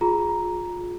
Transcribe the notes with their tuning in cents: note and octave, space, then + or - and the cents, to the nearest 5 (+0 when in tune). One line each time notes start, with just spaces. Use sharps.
F4 +30 G#4 +0 A#5 +0